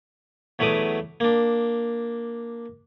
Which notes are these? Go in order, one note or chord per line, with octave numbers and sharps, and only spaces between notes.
E2 F#3 A3 B4 D6 D#6
A#3 D4